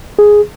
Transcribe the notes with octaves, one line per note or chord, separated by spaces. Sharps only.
G#4